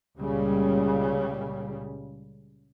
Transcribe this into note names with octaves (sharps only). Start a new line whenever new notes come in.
C#2 A#2 C#3 G3